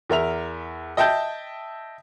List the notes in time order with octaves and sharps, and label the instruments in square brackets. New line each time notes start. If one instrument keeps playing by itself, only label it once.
[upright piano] E2 A#4 E5 F7
D#5 E5 G5 A5 G6